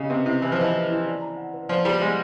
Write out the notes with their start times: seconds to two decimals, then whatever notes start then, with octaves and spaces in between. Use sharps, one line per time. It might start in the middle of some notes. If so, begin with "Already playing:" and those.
Already playing: C#3 G4 D#5
0.10 C3 B4
0.25 C3 E4
0.41 E3 G4
0.52 F3
0.57 E3 D#5
0.74 B4
0.89 E4
1.05 D5
1.21 A#5
1.37 F#5
1.53 B4
1.69 F3 D5
1.84 G3 A#5
2.01 G#3 F#5